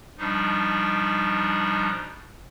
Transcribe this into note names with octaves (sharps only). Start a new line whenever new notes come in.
B2 F3 G3 D4 D#4